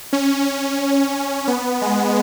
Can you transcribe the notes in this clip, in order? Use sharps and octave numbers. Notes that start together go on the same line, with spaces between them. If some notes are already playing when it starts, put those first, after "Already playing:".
C#4
C#4
B3
G#3